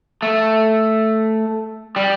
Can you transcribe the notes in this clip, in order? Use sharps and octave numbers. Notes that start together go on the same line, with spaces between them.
A3
G3